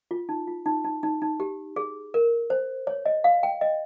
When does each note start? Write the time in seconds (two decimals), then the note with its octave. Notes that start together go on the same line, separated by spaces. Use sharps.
0.11 F4
0.29 D#4
0.47 F4
0.66 D#4
0.84 D#4
1.03 D#4
1.22 D#4
1.40 G4
1.76 G#4
2.14 A#4
2.50 C5
2.87 C#5
3.06 D#5
3.24 F5
3.43 G5
3.61 D#5